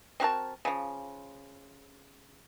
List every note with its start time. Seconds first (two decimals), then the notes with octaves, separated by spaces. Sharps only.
0.20 C4 F#4 A#4 A5
0.65 C#3 F3